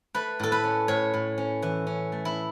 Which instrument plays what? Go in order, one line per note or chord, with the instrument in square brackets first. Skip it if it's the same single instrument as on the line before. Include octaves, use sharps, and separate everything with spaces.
[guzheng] A3 B4
A2 A4
B4
C#4
A2 C#5
A2
C#4
E3
C#4
A3
E4